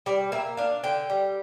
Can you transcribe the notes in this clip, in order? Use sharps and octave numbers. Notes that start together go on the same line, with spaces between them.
G3 D5
A#3 E5
D4 F5
D3 G5
G3